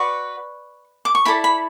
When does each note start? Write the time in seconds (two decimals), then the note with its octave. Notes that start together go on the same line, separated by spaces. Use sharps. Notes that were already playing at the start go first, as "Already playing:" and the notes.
Already playing: F#4 B4 D5 C#6
1.05 D6
1.15 C#6
1.25 E4 A4 D5 B5
1.44 B5